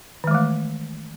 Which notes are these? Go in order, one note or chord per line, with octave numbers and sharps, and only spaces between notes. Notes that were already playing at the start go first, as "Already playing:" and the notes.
D#3 E3 G#3 A3